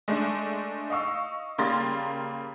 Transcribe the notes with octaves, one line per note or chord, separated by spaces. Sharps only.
G#3 A3 D4
D#5 F5 C#6 E6
C#3 G3 A#3 C6 A6 A#6